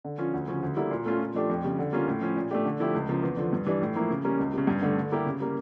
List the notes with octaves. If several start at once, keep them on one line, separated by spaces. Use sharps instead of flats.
D3
F3 C#4 F4
D2
C#3 F3 C#4
D2
D3 G3 A#3 E4
A#2
A3 C#4 F4
A#2
F3 A3 D4 G4
F2
C#3 G3
D3
G3 A#3 C#4 F4
A2
F3 C#4
A#2
A3 D4 G4
D3
F3 A3 E4 G4
C#2
C#3 F3 A#3
E2
D3 F3
G2
E3 G3 D4
A2
F3 A#3 E4
C#3
G3 A#3 C#4
C#2
C#3 G3
G2
D3 A3 D4
D3
G3 A#3 E4 G4
C#3
G3 A#3